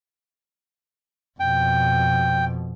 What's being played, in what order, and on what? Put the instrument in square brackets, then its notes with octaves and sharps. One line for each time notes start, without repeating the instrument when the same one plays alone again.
[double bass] F2 B2 [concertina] G5